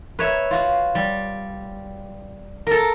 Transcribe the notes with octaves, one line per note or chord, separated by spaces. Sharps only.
B4 C#5 E5
F4 F#4
G3
A4 A#4